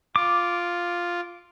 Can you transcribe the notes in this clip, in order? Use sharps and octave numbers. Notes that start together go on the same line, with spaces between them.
F4 D6